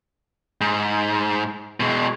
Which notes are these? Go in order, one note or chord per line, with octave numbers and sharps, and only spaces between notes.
G#2
B2 G#3